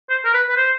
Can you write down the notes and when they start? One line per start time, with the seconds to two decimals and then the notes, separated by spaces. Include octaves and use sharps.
0.10 C5
0.25 A#4
0.34 B4
0.49 B4
0.57 C5